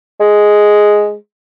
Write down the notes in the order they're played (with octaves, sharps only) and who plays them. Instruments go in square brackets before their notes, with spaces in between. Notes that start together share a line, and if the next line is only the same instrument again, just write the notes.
[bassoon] G#3